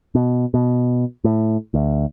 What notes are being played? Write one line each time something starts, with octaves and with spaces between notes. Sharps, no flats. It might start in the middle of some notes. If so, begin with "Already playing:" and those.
B2
B2
A2
D2